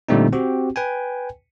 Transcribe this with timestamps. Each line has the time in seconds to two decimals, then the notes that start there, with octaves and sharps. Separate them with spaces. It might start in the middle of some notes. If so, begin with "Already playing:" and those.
0.09 A#2 D3 G3 A3 C4 D#4
0.33 C4 F#4 G4
0.76 B4 G5 G#5